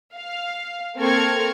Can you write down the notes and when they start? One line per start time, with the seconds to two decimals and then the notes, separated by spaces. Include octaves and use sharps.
0.15 F5
0.98 A#3 C4 A4 C#6 F6 G#6